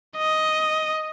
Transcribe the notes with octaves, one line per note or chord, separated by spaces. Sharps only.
D#5